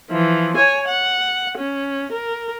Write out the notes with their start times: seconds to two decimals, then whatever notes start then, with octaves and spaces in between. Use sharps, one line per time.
0.11 E3 F3
0.57 C#5 G#5
0.88 F#5
1.58 C#4
2.12 A#4